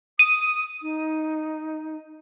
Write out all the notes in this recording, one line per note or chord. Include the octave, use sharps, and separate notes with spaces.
D#6 D#7
D#4